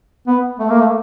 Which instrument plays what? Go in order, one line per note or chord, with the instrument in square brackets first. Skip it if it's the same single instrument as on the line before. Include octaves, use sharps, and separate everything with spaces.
[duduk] B3
A3
A#3
A3